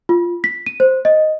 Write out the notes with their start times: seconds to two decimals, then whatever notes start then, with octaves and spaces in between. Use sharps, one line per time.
0.09 F4
0.44 B6
0.66 D#7
0.80 C5
1.05 D#5